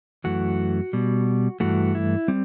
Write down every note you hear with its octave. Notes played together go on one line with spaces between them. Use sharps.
F#2 E3 A3 F#4
B2 G3
G2 E3 A3 F#4
E4
G3 C4